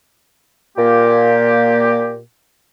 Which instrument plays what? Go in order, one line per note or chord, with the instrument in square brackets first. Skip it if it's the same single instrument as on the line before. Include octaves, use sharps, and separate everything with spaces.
[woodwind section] A#2 A#3 G4